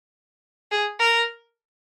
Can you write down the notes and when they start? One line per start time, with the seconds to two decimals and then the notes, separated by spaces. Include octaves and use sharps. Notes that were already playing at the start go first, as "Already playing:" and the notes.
0.71 G#4
1.00 A#4